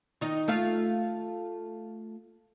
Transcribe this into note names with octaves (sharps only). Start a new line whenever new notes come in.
D#3 D#4
A3 F4 F5